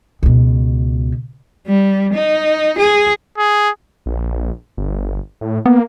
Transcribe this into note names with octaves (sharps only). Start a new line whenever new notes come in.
C#2 B2
G3
D#4
G#4
G#4
A#1
G1
A2
A#3 B3